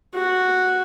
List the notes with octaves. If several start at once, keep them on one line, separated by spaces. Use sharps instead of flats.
F#4